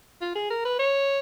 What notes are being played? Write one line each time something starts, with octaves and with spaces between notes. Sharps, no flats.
F4
G#4
A#4
B4
C#5